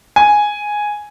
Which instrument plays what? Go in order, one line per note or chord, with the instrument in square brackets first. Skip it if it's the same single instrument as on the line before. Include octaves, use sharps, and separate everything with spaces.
[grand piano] G#5